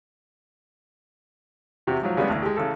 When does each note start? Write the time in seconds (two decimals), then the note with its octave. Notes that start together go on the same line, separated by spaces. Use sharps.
1.87 E2 C3 F#4 G4
2.01 G#2 F3 F#3
2.17 C#3 G3 G#3 B3 D4
2.29 A1 D2
2.43 G#3 G4
2.57 A1 C#3 A4